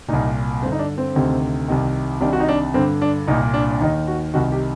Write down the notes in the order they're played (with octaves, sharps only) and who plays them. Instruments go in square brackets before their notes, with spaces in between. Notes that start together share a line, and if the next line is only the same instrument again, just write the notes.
[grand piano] C2 A#2 D#4
G2 C4
D3
D#4
D4
C4
D2 C3 D#3
C2 C3 D#3
C2 C3 D#3 D4
F#4
D#4
D4
G2 D3 C4
D4
C2 A#2 D#4
D4
D4
D#2 D#3 D#4
F#4
C2 C3 D#3 F#4
G4